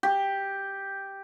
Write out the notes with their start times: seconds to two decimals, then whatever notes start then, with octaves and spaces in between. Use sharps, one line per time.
0.03 G4